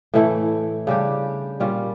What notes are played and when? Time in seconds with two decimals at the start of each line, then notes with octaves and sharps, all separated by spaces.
0.14 A2 E3 A3 E4
0.87 C#3 G3 D4 G4
1.60 A#2 G3 C#4 F4